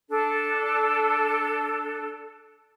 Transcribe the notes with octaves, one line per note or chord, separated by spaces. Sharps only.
D4 A4